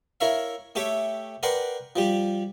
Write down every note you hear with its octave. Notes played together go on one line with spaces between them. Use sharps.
E4 A#4 C#5 E5 F5
A3 G4 A4 C#5 E5 G5
A#4 B4 D5 F#5 G5 C6
F3 G3 G4